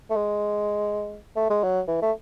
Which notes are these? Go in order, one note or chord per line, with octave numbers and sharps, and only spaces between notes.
A3
G#3
A3
G#3
F#3
E3
A3